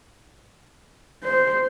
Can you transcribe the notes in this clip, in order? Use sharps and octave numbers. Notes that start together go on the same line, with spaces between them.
C5